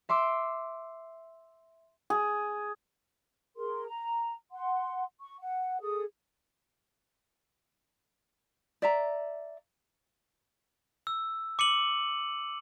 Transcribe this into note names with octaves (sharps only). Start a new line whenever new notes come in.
E5 C6 D6 E6
G#4
G#4 A#4 C6
A#5
F#5 C6
C#6
F#5
G#4 A4 D#6
D5 E5 A#5
E6
D6 C#7 D#7 F#7